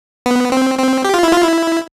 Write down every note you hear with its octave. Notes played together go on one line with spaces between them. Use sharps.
B3
C4
C4
G4
F4
E4
F4
E4